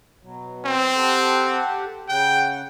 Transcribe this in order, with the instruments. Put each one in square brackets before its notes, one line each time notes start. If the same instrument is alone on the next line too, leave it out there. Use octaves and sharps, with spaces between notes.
[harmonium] B2 F#3
[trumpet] C4
[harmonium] G4 A4 F#5
[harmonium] C#3 F#5 [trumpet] G5